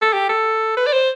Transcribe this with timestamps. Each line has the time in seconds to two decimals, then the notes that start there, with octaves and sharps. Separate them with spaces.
0.02 A4
0.13 G4
0.29 A4
0.77 B4
0.87 D5
0.93 C5